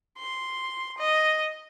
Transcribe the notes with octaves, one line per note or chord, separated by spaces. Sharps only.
C6
D#5